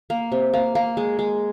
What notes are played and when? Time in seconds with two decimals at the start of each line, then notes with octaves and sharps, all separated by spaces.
0.10 A#3
0.32 C3
0.54 A#3
0.75 A#3
0.97 G#3
1.19 G#3